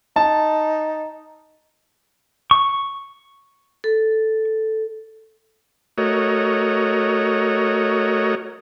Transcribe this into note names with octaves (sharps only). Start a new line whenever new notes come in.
D#4 A5
C#6
A4
A3 F#4 A#4 C#5 D#5